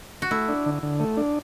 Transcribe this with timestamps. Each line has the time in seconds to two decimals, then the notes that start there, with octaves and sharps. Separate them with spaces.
0.22 F#4
0.31 A3 E4
0.49 D4
0.66 D3
0.83 D3
1.00 A3
1.17 D4